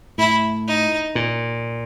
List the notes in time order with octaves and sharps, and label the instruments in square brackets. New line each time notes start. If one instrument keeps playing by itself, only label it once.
[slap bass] A2 [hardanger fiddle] E4
[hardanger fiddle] D#4
[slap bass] A#2